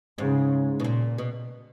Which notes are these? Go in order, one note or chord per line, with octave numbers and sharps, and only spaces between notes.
G#2 C#3
B2
A#2
B2